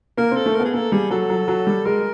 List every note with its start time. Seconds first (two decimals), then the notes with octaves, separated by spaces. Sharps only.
0.17 A#3 A#4
0.31 C4
0.37 A4
0.46 A3
0.55 B3 A#4
0.65 G#4
0.74 A#3 A4
0.92 G3 G#4
1.10 F#3 A4
1.30 F#3
1.48 F#3
1.67 G3
1.85 G#3 A#4